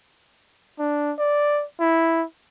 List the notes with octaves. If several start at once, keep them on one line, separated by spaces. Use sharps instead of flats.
D4
D5
E4